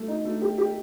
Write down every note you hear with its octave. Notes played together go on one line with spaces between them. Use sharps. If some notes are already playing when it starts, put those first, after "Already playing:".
Already playing: A3
D#4
A3
G4
G4